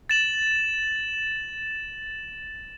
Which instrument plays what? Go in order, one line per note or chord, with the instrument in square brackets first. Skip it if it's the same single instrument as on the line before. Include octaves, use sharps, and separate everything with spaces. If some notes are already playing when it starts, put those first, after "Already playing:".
[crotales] A6 E7 F#7